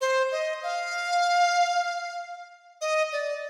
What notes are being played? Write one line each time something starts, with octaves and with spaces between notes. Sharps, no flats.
C5
D#5
F5
D#5
D5